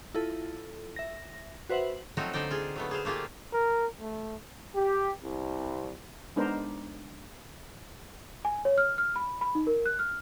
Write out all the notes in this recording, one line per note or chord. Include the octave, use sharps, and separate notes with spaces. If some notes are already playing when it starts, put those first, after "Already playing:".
E4 F4 A4
E5 A#6
F#4 B4 C5 E5 F#5 F#7
F3 F#3 A3 C4 D#4 F#4
D3 D#4 C5 D5 G5
F4 G#4
F#3 A3 B3
G#4 C5 F5
A3 A#3 F4 G4 G#4
A#4
A3
G4
C2
G#3 B3 D4 D#4 A#4 C5
G#5
C#5
F6
F6
B5
B5
D#4
A#4
F#6
F6